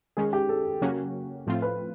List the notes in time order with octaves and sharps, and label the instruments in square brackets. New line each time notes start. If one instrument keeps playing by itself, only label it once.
[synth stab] D#3 G#3 C#4 [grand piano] G#4
[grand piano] G4
A4
[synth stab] C#3 F#3 A#3 C#4 F#4
A2 F3 A3 C4 F4
[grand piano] B4